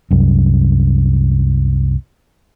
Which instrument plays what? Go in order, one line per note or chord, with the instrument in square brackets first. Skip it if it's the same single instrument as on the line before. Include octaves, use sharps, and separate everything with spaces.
[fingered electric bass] C2 F#2